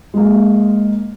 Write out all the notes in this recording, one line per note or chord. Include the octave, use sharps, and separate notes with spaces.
G#3 A#3